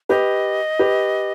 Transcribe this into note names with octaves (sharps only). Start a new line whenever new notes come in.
G4 B4 D#5
G4 B4